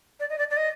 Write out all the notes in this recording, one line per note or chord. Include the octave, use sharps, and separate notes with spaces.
D5
D#5
D5
D5
D#5